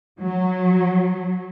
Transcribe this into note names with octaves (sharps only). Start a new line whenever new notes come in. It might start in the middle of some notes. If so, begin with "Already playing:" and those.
F#3